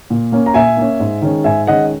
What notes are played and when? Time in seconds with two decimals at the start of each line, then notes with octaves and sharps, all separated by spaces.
0.10 A#2
0.32 A#3 C#4
0.46 A#5
0.54 A#2 E5 G#5
0.77 A#3 C#4
1.00 G#2
1.22 D#3 G#3 C#4
1.44 G#2 E5 G#5
1.67 D#3 G#3 C#4 D#5 F#5